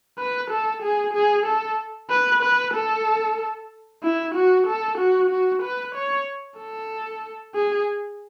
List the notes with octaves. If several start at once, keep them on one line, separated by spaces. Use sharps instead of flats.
B4
A4
G#4
G#4
A4
B4
B4
A4
E4
F#4
A4
F#4
F#4
B4
C#5
A4
G#4